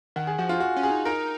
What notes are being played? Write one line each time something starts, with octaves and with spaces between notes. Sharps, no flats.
D#3 F#5
G#4
F3 F#4
F4
F#4
C#4
G#4
D#4
D#4 A#4